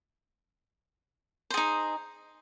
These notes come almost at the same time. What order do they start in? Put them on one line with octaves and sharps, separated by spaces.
C5 G#4 D#4